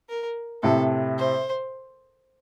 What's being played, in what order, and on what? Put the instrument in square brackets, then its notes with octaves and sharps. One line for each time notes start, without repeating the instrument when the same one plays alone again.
[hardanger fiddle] A#4
[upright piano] A2 C3 [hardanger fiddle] A4
[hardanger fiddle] C5